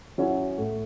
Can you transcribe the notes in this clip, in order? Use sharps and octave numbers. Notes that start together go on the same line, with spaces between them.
F#3 C#4 E4
A2